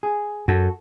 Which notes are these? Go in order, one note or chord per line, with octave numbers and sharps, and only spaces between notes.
G#4
F#2 F#4 A4